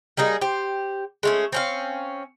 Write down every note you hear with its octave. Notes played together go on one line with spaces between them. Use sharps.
G3 A#3 D#4 G#4
G4 C5
G#3 A3 C#4
C4 C#4 F5